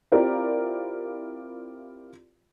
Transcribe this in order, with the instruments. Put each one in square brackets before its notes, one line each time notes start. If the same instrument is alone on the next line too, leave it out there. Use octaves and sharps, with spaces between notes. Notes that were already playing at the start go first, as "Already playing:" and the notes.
[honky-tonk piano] C4 E4 F4 G4 A#4 D5